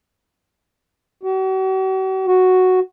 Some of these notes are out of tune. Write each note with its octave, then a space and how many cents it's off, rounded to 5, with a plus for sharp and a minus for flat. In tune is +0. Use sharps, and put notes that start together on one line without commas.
F#4 +45
F#4 +0